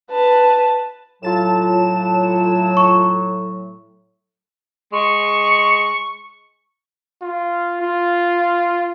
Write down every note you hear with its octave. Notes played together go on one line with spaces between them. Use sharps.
B4 A5
A2 F#3 F4 A5 E7
C#6
G#3 C#6
F4
F4